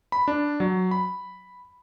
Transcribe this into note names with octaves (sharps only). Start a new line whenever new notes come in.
B5
D4
F#3
B5